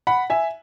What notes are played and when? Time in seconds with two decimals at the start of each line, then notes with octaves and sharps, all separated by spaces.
0.07 F#5 B5
0.30 E5 G#5